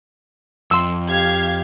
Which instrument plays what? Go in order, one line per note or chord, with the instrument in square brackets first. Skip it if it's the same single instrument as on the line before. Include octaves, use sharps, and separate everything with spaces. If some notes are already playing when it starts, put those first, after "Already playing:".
[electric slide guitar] F2 [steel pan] C6 E6
[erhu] G4 [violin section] F5 G#6